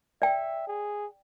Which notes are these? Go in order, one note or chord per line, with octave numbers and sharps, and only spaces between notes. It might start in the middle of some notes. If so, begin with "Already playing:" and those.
D5 E5 G5
G#4